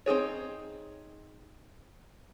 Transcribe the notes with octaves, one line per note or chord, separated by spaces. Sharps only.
C4 D#4 G#4 C#5